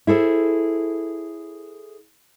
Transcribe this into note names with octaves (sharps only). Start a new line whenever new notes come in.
E4 G#4 A4 C5